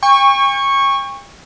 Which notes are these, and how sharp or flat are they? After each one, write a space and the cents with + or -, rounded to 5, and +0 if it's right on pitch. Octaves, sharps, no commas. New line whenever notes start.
G5 +40 C#6 -10